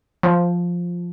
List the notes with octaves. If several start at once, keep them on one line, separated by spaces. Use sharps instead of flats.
F3